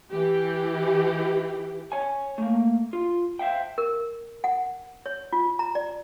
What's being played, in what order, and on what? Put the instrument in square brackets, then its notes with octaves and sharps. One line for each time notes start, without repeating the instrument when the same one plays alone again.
[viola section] E3 G4
[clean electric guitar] C#5 G#5
A3 A#3
F4
C5 E5 F5 G5
[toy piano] A#4
F#5
C#5
F4
A#5
D5